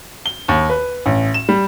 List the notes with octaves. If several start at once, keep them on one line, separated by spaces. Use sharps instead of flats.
G7
D#2
B4
A1
E7
G3